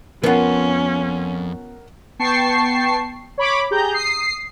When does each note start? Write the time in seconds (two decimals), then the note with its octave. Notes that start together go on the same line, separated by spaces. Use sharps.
0.23 F2 B3 C#4 F4 A#4 F#5
2.19 B3 G5 A5 C#6 C7
3.38 C#5 B5 D6
3.71 G4 G#4 A#5 G6
3.94 D#6 C7